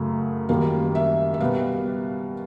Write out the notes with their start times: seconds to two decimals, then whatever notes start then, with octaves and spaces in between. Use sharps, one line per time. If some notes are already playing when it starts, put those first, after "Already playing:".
Already playing: F#2 C#3 F#3 A3
0.49 F#2 D#3 G3 A#3 F5
0.95 E5
1.34 E5
1.40 B2 G3 B3 F5